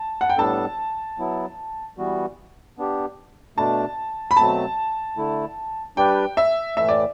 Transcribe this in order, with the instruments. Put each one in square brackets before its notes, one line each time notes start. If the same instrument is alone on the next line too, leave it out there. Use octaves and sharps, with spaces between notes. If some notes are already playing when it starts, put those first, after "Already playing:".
Already playing: [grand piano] A5
F#5
G5
[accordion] A2 G3 B3 D4 A4 [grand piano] A5
[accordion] F#3 B3 E4
E3 G3 B3 F#4
B3 D4 G4
[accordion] B2 A3 D4 [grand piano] A5
[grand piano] B5
[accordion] B2 F#3 A3 C4 [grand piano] A5
[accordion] D3 A3 E4
[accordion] G3 D4 G4 B4 D5 [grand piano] G5
[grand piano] E5
[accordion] A2 E3 A3 [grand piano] E5
[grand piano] D5